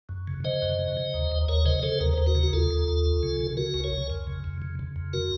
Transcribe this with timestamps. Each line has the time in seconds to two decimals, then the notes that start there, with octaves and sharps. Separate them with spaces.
0.09 F#2
0.27 C#3
0.44 C#3 C5 D#5
0.62 F#2
0.79 C#3
0.97 C#3
1.14 D#2
1.32 D#2
1.48 D#2 A#4 C#5
1.65 C#3 C5 D#5
1.83 C#3 A4 C5
2.00 D#2 A#4
2.13 D#2 C5
2.26 F#4 A#4
2.35 C#3
2.43 F#4
2.53 D#2 F4 A4
2.71 D#2
2.88 D#2
3.06 C#2
3.23 C#3
3.41 C#3
3.57 C#3 F#4 A#4
3.74 C#2
3.84 A#4 C#5
3.92 C#2
4.10 F2
4.27 C#3
4.44 F2
4.62 C#3
4.79 C#3
4.96 F2
5.13 F#4 A#4